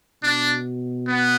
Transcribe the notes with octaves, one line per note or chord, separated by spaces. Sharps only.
B2 D4
B3